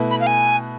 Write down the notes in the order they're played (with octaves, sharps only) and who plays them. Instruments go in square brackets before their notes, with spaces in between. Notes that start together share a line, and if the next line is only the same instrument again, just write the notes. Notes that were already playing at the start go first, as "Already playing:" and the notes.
Already playing: [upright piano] B2 A3 E4 B4
[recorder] B5
F5
G#5